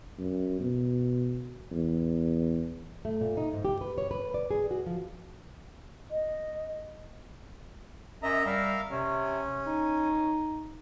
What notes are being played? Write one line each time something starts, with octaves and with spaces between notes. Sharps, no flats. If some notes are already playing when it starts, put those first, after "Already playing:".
F#2
B2
E2
A3
A#2
D#4
G#2
G4
B4
C#5
B4
D5
G#4
F#4
F3
D#5
F#2 D#5 E5 A#5
G3 A#4 E5 F5
C3 C#4
D#4